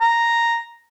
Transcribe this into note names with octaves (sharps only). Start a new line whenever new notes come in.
A#5